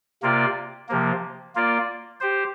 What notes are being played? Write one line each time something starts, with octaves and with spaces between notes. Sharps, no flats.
C3 A#3 F4 D5
C3 F3 A#3
A#3 F4 D5
G4 C5